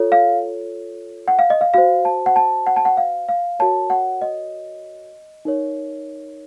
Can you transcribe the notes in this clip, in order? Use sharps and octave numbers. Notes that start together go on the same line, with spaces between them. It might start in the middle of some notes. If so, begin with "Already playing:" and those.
Already playing: F4 A4 C#5
F5
F#5
F5
D#5
F5
F#4 C5 F5
A5
F#5
A5
F#5
A5
F#5
F5
F5
F#4 A#4 C#5 A5
F#5
D#5
D#4 A#4 C#5